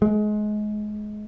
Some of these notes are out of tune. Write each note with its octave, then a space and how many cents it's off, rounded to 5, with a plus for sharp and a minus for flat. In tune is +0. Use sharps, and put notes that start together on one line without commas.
G#3 +25